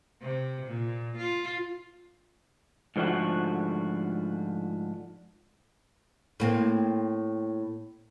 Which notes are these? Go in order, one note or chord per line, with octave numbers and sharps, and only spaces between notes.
C3
A#2
F4
G#2 D3 F3 A3 F#4
A2 A#3 C4